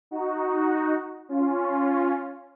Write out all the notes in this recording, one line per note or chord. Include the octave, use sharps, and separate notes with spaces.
D#4 F#4
C#4 F4